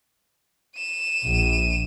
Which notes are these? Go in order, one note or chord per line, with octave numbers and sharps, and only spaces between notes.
D#7 E7
A#1